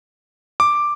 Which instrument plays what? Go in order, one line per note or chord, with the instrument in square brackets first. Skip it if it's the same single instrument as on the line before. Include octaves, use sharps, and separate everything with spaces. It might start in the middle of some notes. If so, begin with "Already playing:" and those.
[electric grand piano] D6